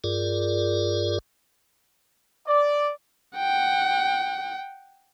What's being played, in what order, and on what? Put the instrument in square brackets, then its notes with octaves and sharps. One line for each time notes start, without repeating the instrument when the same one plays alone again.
[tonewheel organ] G2 F4 G#4 A#4 D5
[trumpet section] D5
[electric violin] F#5 G5